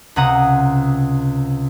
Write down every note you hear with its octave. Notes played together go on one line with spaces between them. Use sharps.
C#2 C3 F#5 A#5 D#6